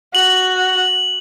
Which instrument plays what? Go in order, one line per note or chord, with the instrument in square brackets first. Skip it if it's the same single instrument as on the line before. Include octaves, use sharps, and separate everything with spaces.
[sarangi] F#4 [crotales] F#7